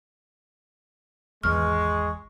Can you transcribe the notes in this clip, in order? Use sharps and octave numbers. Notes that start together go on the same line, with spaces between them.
G#1 E2 E3 G#3 C#6 F6